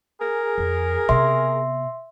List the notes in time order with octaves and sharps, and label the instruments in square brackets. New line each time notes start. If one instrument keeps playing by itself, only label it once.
[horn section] G#4 A#4
[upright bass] F2
[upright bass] C3 B3 [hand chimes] E5 C6